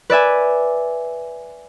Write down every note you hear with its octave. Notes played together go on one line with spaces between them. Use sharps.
B4 D5 E5 G#5